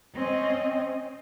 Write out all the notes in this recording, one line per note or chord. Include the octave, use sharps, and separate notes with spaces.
C4 C#4 D#5